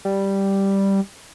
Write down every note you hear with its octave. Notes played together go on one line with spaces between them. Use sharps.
G3